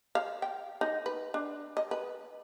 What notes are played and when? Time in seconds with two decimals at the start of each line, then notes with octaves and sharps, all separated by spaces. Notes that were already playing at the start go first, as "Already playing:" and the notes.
0.15 F5
0.42 G5
0.81 D#4
1.06 B4
1.34 D4
1.77 D#5
1.91 B4